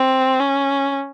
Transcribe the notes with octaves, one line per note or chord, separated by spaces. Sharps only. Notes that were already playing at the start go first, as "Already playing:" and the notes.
Already playing: C4
C#4